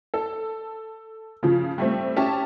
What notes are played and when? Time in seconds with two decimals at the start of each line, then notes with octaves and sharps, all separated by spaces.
0.14 A4
1.43 C#3 F3
1.78 G3 A3 C4
2.16 C#4 G4 E5 A5